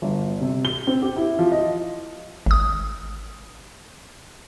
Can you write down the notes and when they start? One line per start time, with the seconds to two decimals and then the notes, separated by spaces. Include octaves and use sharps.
0.02 G1
0.41 C3
0.65 G7
0.87 C4
1.02 G4
1.16 E4
1.39 F3
1.52 D#5
2.46 G#1 D#6